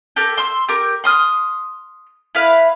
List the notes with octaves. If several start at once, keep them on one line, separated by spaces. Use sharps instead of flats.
G4 A4 A#4
C6 E6
G4 A#4
C6 D#6 F6
E4 B4 F5